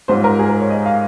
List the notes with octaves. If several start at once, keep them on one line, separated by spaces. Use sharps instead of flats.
G#2 G3 C#4 F4 C5
A#4
G#4
A#4
C#5
D#5
F5